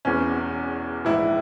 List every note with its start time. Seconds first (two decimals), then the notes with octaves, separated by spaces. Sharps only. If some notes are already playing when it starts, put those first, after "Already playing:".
0.05 E1 E2 E3 C#4
1.05 A#1 G#2 E3 E4